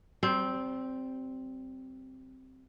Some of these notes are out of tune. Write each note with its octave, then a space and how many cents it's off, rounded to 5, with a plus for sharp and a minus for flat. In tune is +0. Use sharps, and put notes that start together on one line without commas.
G3 -30 C4 +0